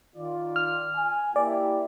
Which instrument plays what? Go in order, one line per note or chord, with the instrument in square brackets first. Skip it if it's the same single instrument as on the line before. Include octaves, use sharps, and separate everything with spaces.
[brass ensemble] D#3 F4 D5
[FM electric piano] F6
[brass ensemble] G#5
[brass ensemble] A#3 E4 G4 [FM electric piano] D5